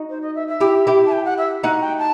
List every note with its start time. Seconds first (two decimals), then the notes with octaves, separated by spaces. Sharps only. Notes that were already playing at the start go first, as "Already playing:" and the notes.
Already playing: D#4 F#4
0.09 C5
0.22 D#5
0.35 E5
0.48 E5
0.60 E4 G4
0.87 E4 G4
1.06 A5
1.12 G5
1.25 F#5
1.38 E5
1.63 D#4 F#4 F#5
1.81 G5
1.98 A5